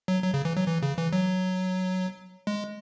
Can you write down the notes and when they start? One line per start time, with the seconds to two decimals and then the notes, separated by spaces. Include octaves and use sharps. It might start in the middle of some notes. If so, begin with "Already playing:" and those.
0.08 F#3
0.23 F#3
0.34 C#3
0.45 E3
0.57 F#3
0.68 E3
0.83 C#3
0.98 E3
1.13 F#3
2.47 G#3